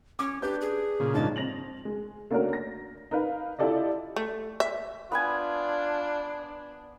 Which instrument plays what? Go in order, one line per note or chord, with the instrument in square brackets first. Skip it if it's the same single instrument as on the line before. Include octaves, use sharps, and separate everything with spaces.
[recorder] C#4 [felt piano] D6
[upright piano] D4 B4 G6 [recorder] G4
[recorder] G#4
[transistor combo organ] A#2 C#3
[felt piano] G#2 F3 [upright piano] D4 D#5 [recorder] A5
[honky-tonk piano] C4 A#6 F7 F#7
G#3
A3 A#3 C#4 D4 F#4 A#4
A#6
D#4 A#4 B4 F5
E4 F4 G4 A4 D5 D#5
[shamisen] A3
E5
[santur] B3 B4 G#5 [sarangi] D4 [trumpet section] F4